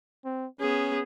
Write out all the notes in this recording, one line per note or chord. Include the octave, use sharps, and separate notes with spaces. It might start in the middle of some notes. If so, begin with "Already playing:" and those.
C4
B3 C#4 G#4